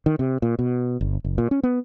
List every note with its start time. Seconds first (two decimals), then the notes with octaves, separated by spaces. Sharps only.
0.06 D#3
0.19 C3
0.42 A#2
0.59 B2
1.01 G1
1.24 F#1
1.38 A#2
1.51 C#4
1.63 B3